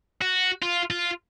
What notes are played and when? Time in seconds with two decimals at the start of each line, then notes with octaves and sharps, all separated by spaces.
0.22 F#4
0.62 F4
0.90 F4